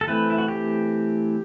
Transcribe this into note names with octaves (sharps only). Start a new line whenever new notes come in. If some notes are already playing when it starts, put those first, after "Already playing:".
A4
E3 A3 C4 B4
E4
F#4
G4